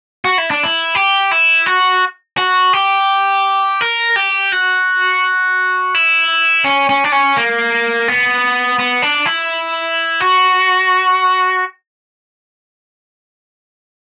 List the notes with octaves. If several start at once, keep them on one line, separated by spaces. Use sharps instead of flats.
F#4
E4
D4
E4
G4
E4
F#4
F#4
G4
A#4
G4
F#4
E4
C#4
C#4
D4
C#4
A#3
B3
B3
D4
E4
F#4